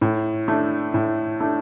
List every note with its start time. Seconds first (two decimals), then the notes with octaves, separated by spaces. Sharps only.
0.01 A2
0.48 A3 D4
0.94 A2
1.40 A3 D4